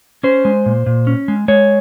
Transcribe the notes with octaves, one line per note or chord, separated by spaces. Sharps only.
C#4 C5
G#3
A#2
A#2
C#4
G#3
G#3 C#5